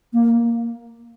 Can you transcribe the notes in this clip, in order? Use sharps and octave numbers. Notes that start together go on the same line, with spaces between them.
A#3